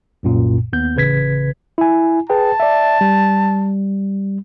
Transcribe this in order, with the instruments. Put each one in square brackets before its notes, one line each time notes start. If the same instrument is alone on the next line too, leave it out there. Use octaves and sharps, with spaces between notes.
[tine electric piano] C2 F#2 A#2
D#2 B3 G6
A1 C#3 B4 G#6 B6
E4 G#5
[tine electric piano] G#4 B4 G5 [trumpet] A5
[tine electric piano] D5 E5
G3